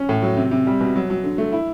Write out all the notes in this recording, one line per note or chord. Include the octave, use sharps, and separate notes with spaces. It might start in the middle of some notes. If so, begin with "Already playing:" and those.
Already playing: C#4
A2
F#3
C3
C3
G3
B2
F#3
F#3
D3
A3
E4